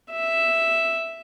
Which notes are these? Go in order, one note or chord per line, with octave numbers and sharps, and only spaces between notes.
E5